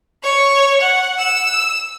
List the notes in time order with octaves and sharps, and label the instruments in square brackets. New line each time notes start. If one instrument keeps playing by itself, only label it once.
[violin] C#5 C#6
F#5
E6